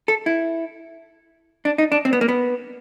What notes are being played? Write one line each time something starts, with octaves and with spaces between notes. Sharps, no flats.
A4
E4
D4
D#4
D4
C4
B3
A#3
B3